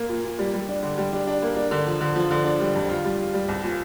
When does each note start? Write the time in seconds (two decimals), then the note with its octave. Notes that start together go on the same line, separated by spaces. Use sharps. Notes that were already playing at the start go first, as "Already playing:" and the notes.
Already playing: A#3
0.09 A#2
0.25 A#2
0.39 G3
0.54 G3
0.68 D4
0.83 D3
0.98 G3
1.13 D4
1.27 D4
1.42 A#3
1.57 D4
1.71 D3
1.87 F3
2.01 D3
2.16 F3
2.31 D3
2.45 D4
2.60 G3
2.75 F2
2.89 F4
3.05 G3
3.19 F4
3.34 G3
3.49 C2
3.64 A#2